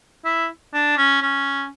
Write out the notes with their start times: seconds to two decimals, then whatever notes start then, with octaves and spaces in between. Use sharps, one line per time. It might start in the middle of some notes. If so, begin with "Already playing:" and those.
0.25 E4
0.73 D4
0.97 C#4
1.22 C#4